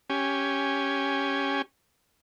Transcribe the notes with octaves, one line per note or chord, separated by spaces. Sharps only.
C#4 G4 G#5